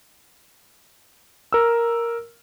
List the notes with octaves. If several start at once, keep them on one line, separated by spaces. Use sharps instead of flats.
A#4 E6